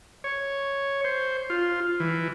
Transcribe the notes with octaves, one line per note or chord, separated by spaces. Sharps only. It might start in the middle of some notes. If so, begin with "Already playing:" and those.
C#5
C5
F4
E3